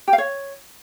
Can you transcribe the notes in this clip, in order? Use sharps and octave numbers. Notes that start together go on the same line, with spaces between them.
G4
F5
C#5